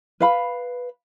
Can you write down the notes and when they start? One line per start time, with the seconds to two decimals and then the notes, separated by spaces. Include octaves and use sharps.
0.20 B4 F5 B5